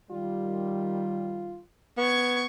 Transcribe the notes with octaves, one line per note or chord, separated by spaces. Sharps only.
D#3 G3 F4
B3 C#6 G#6